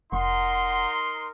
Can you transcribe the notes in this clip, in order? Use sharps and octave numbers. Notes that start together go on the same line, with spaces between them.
F1 D#4 A#4 F#5 C6